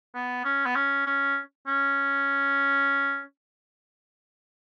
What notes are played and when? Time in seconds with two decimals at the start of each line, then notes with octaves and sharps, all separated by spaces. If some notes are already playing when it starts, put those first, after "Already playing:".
0.15 B3
0.45 C#4
0.66 B3
0.75 C#4
1.06 C#4
1.67 C#4